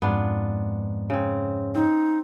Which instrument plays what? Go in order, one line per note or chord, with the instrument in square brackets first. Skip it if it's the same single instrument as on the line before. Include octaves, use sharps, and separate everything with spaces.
[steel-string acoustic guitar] F2 G#2 [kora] B3 D4 F4
[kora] C#3 C4
[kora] C4 [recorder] D#4